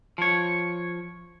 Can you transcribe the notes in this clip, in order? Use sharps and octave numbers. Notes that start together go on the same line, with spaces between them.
F3 C#5